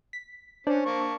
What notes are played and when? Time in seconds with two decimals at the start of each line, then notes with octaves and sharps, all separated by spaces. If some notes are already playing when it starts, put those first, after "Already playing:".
0.13 B6
0.67 C#4 D4 C5 D5
0.86 A#3 A5 C#6